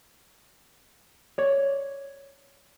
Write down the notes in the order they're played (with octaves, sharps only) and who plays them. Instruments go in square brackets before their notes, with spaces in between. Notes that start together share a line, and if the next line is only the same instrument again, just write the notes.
[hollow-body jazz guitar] C#5 D5